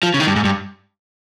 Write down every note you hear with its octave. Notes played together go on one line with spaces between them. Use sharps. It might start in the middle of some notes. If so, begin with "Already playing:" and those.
F3
C#3
D#3
G2
G#2
G2